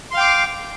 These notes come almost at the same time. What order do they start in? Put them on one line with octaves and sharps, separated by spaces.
C6 F5 G5 D6